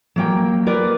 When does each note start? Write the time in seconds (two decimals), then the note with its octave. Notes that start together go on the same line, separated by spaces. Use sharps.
0.16 F#3 A#3 G5
0.67 A#4 B4 D5